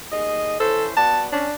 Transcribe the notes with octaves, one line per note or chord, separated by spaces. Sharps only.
D#2 G#4 D#5
E3 C#4 A4 C5
B3 F#4 D5 A5
C#4 D4